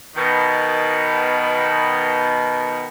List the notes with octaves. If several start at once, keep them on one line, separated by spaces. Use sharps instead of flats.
B2 D#3